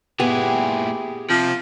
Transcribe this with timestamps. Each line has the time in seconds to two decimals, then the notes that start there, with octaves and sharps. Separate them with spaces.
0.20 A#2 B3 E4 G4 G#4 G#5
1.29 C3 F3